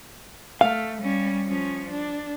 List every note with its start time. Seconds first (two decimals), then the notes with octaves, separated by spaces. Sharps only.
0.61 A3 F5
1.02 G3 C#4
1.47 F3 C#4
1.90 D4